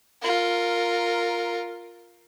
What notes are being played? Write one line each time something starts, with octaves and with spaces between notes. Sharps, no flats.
F4 A#4